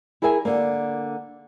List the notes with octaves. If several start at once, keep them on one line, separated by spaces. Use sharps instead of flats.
E4 G#4 A#4 E5 G#5
D3 A#3